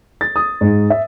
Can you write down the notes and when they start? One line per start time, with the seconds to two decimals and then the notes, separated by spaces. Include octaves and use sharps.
0.21 A6
0.36 D#6
0.61 G#2
0.90 E5